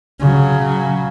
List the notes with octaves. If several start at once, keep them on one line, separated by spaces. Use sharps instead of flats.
C#3 F#3